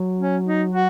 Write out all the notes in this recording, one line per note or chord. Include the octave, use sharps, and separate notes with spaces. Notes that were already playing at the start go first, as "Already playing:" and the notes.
Already playing: F#3
C#4
D#4
F#4